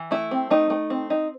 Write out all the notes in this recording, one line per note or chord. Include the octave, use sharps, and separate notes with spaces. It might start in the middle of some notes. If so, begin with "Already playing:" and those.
Already playing: E3
A3 E4
C4
A3 D#4
A3
C4
D#4